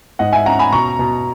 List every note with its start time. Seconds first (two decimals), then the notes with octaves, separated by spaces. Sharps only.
0.19 G#2 D#5 F#5
0.33 E5 G#5
0.46 C#4 F#5 A#5
0.59 G#5 B5
0.72 B2 A#5 C#6
0.99 B2